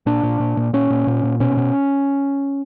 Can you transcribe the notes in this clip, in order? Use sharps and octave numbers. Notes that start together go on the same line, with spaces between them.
A#2 D4
A#2
A#2
A#2
A#2 C#4
A#2
A#2
A#2
B2 C#4
B2